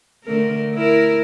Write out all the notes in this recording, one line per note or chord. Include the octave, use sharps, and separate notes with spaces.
D3 A3 A#4
E4 A#4